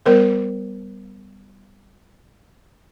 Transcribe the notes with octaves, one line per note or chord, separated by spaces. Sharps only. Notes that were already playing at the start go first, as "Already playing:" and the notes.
G3 B3 A#4 C5